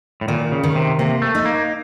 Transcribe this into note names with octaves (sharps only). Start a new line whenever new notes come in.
A2
A#2 D#3
C#3
D#3
C3
C3 A#3
A3
D#4
A#3